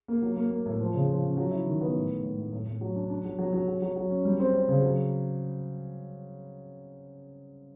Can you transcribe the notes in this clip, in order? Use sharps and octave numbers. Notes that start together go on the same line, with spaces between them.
A#3
F#3
A#3
A#3
A2
F3
C#3
F3
C#4
F#3
E4
D#3
B3
A2
A2
A2
A2
A2
A2
F#3
D4
D4
F#3
F#3
F#3
F#3
F#3
F#3
C#4
G3
C4
C4
C#3
F#3